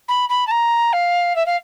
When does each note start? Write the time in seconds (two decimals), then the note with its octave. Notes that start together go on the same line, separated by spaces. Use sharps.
0.08 B5
0.29 B5
0.47 A5
0.51 A#5
0.93 F5
1.36 E5
1.46 F5